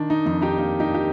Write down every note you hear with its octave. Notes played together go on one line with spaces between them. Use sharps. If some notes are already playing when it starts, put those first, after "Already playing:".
Already playing: D#3 D4
D#4
F2 D#4
D#4 G4
A#3 D#4
D#4 G4
D4
G4